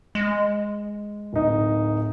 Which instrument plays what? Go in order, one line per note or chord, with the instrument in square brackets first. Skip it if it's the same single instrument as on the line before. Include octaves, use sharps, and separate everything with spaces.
[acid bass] G#3
[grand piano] D1 D#4